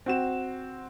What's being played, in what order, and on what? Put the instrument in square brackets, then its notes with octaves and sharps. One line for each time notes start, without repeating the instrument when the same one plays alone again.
[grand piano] C4 F#4 E7